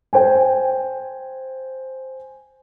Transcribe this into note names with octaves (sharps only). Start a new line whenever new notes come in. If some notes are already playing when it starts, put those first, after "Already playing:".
C5 G5 G#5